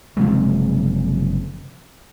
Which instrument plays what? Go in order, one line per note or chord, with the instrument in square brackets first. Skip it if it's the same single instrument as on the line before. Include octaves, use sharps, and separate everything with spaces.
[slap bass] F#1 C3 F3 G#3